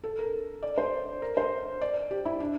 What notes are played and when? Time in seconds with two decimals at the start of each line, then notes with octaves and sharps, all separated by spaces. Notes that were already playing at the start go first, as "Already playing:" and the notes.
0.04 A4
0.19 A#4
0.63 D5
0.78 C5
1.22 A#4
1.37 C5
1.81 D5
2.11 G4
2.25 E4
2.40 D4